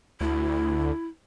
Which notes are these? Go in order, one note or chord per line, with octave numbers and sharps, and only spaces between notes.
D2 E4